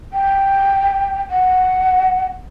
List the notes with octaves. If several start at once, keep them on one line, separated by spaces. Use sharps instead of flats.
G5
F#5